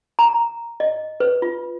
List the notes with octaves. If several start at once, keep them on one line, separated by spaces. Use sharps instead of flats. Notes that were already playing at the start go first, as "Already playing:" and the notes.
A#5
D#5
B4
F4